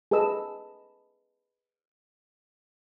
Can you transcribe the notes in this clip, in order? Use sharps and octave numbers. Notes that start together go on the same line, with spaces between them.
G#4 A4 B4 D#5 E6